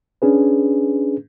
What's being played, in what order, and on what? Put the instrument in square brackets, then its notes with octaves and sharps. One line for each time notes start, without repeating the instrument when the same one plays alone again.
[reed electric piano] C#4 D4 G#4 B4